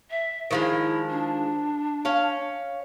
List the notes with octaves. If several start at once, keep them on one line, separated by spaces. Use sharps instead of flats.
E5
D#3 F3 G#3 E4
D4
C#4 C#5 F5